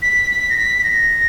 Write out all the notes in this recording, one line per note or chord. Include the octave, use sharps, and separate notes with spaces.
B6
B6
A#6
B6
B6
A#6